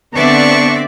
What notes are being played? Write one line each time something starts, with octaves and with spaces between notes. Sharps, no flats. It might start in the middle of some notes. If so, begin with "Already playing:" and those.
D3 B3 C4 D4 D5 E5 A5 C#6